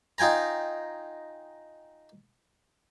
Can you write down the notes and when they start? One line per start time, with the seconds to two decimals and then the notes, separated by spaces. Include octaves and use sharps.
0.18 D#4 F4 G5 G#5 A#5